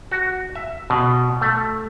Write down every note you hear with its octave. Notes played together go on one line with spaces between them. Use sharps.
F#4
E5
B2
A3